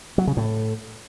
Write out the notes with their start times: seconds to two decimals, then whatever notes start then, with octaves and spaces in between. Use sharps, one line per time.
0.18 F#3
0.27 C#3
0.37 A2